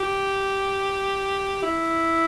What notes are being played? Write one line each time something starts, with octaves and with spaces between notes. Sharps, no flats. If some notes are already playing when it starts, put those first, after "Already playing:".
Already playing: G4
E4